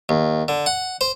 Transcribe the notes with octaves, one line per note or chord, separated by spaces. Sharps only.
D#2
D3
F#5
C5